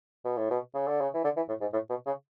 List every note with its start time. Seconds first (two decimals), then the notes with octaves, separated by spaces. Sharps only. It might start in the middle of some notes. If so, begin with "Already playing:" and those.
0.25 B2
0.37 A2
0.51 B2
0.74 C#3
0.88 D3
1.01 C#3
1.14 E3
1.24 D3
1.37 E3
1.48 A2
1.61 G#2
1.73 A2
1.89 B2
2.06 C#3